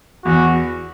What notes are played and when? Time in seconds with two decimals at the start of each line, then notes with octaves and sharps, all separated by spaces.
0.25 E2 F#4